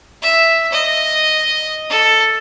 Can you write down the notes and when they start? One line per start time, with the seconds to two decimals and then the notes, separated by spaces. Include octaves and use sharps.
0.22 E5
0.72 D#5
1.89 A4